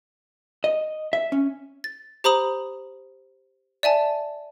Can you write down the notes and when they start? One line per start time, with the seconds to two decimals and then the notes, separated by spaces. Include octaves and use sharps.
0.64 D#5
1.13 E5
1.32 C#4
1.84 A6
2.24 G4 C5 A#5 B5 D#6 F#7
3.83 D5 E5 G#5 A5